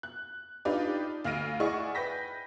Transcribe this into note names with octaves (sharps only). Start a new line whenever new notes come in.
F#6
D4 D#4 F4 G4 B4 D5
D2 F5 F6 A#6 D7 D#7
E4 G#4 D5 D#5 F#5 C#6
B4 G5 G6 A#6 B6